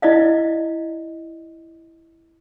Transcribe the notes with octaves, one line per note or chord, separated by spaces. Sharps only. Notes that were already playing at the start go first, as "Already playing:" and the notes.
E4 D5 D#5 F5